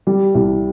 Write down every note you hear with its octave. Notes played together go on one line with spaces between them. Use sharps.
G3
C2